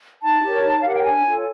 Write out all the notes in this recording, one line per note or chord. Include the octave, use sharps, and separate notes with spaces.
D#4 A5
G4 A#4 C#5
D#4
F5
G4 A#4 C#5 F#5
G5
D4 G#5
F4 A4 C#5